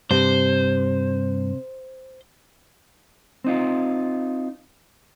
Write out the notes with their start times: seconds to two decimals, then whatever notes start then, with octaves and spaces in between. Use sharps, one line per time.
0.11 G2 C3 C5
3.44 C4 D#4 F4